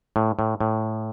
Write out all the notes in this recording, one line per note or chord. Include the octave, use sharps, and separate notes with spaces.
A2
A2
A2